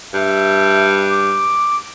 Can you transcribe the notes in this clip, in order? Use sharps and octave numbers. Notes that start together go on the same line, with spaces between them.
G2 E5
D6